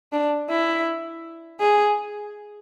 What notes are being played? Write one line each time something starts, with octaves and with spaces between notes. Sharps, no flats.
D4
E4
G#4